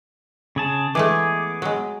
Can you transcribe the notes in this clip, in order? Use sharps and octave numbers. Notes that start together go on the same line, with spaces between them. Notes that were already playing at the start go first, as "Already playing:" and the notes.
C#3 G#4 A5
E3 G#3 A3 B3 G#4 D6
F#3 G#3